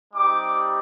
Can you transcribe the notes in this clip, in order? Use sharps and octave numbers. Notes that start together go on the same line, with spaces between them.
G3 C4 D#4 G4 D6